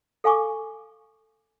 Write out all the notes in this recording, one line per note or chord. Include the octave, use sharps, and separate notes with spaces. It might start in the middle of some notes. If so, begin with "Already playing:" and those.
A4 F5 G#5 C#6 D6